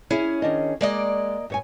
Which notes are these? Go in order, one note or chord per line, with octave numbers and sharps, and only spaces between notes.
C#4 E4 G#4
D#3 D4 D#5
G#3 A#3 D5 D#5
G2 C#5 G#5